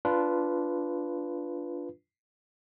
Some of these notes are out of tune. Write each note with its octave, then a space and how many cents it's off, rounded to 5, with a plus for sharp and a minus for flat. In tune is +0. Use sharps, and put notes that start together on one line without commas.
D4 -10 F4 -10 B4 +0